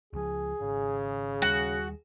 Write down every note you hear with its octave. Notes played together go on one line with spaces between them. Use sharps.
C#2 F3 G#4
G#1 C#3
D#2 G3 F#4